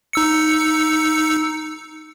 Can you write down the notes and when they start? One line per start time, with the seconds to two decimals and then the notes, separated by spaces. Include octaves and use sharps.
0.13 D#4 E6 C#7